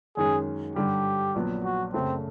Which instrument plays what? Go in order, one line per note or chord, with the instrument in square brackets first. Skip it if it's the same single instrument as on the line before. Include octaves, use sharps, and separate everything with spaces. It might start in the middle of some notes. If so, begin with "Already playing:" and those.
[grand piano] F#2 D#3 G#3 C#4 [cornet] G#4
[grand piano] G2 D3 G3 [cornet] G4
[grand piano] A#1 A#2 F#3 B3
[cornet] F#4
[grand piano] F#2 C#3 F#3 A3 [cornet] C4